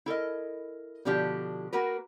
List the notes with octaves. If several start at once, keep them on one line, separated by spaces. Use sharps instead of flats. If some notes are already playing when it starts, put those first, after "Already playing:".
E4 A4 A#4 D#5
B2 D3 F3 D4 G4
A#3 F#4 A#4 B4